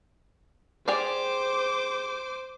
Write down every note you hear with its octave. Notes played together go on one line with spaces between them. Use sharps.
G4 G#4 C5 D5 D6